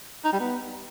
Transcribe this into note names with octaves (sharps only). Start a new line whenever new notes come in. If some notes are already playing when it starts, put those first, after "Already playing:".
D#4
G3
B3